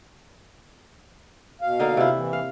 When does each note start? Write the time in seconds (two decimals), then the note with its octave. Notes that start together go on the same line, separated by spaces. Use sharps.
1.62 B2 F5
1.79 D3 A#3 D#4
1.97 C3 E4
2.16 E3
2.33 F5